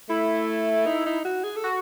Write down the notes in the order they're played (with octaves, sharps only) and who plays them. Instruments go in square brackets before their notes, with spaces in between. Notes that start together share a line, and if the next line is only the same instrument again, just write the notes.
[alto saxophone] A3 [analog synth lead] E4
[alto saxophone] D#4
D#4
F#4
G#4
A4
[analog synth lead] F#4